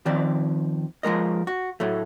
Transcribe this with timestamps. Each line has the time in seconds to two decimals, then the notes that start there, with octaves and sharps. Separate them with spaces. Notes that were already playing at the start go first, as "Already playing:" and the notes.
0.06 D#3 F3 C4 D5
1.03 F3 G#3 A#4 D#5
1.47 F#4
1.80 A2 F#3 A3